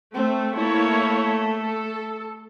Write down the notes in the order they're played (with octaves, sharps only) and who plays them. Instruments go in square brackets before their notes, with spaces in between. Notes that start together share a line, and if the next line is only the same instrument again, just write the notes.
[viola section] A3 [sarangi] C4
[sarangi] A3 [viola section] A#3 E4 C#5
[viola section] A4